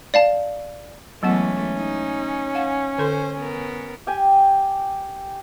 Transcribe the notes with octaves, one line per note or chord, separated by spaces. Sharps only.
D5 F5 A5
E3 F#3 G#3 A3 B3 C#4 F#5
D#4
F5 F#5 G#5
D3 A4 C5 C6
B3 A#4
G4 G5 G#5